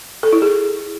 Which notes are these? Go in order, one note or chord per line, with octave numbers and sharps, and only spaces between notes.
A4
E4
G#4